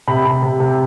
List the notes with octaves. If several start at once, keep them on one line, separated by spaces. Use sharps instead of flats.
C3 B5
C3
C3
C3